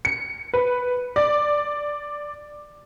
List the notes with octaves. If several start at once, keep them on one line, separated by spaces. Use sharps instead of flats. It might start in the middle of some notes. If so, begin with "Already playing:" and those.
C#7
B4
D5